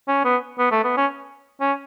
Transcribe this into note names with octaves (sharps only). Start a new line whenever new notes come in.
C#4
B3
B3
A3
B3
C#4
C#4